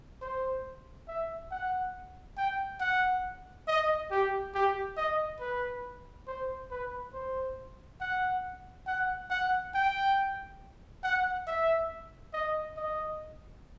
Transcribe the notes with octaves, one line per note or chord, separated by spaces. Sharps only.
C5
E5
F#5
G5
F#5
D#5
G4
G4
D#5
B4
C5
B4
C5
F#5
F#5
F#5
G5
F#5
E5
D#5
D#5